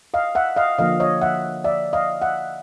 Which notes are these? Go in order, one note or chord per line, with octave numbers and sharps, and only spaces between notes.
D#5 F5
E5 F#5
D#5 F5
D3 F3 A#3 D#5 F5
C#5 D#5
E5 F#5
D5 E5
D#5 F5
E5 F#5